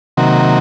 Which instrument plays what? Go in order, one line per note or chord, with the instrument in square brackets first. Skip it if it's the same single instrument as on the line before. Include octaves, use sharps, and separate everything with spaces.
[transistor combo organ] C3 D#3 F#3 A#3